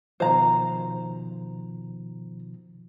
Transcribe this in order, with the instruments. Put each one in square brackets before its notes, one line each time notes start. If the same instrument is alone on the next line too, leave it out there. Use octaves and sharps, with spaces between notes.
[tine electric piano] B2 D#3 F3 [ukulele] C5 A#5